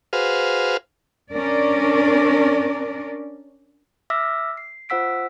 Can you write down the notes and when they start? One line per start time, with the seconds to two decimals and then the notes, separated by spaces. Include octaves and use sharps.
0.13 F#4 G#4 B4 C5 F5 F6
1.32 C#4 D4 A#4 D5
4.10 E5 D6 E6 F6 A#6 B6
4.57 C7
4.89 F4 C5 F#5 E6 B6 D7